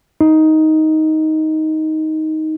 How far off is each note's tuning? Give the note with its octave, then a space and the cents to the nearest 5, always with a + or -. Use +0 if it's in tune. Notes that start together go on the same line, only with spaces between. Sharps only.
D#4 +10